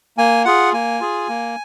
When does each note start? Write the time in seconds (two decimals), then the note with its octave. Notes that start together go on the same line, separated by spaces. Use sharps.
0.17 A#3 G#5
0.45 F4 G#4 F#5
0.73 A#3 G#5
1.00 F4 G#4
1.28 A#3